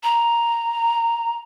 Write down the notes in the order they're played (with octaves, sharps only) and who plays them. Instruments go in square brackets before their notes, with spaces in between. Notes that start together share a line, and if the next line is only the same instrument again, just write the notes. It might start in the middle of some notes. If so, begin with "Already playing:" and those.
[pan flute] A#5